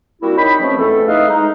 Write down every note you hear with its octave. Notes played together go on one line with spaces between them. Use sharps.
G3 A#3 C4 E4 F#4
D#4 C#5 G5 B5
C#3 E3 F3 A3 C4 C#4
E2 A3 A4
D#4 E4 B4 D#5 F5
G#3 D#4